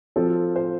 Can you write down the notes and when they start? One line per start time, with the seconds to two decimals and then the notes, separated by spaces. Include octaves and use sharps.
0.16 F3 C4 F4 A4
0.56 C5